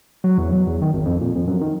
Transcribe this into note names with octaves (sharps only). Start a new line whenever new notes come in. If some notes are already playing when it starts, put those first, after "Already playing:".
F#3
E2
F#3
E2
D#3
G#1
F2
A#2
F2
F#2
D#3